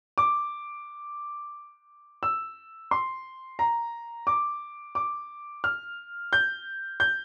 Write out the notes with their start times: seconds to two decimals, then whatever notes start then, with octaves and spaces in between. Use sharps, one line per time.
0.18 D6
2.23 E6
2.91 C6
3.59 A#5
4.27 D6
4.95 D6
5.64 F6
6.33 G6
7.00 G6